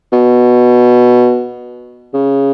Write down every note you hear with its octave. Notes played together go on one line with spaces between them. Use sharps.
B2
C#3